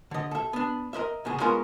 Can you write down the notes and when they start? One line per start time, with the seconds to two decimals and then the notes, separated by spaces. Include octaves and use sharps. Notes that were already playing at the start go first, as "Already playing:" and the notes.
0.11 D3 D#5
0.31 A4 E5
0.53 B3 D4
0.93 A#4 B4 D#5 E5
1.25 E2 C#3 G#4
1.40 G#3 B3 C#4 F4 A#4 C#5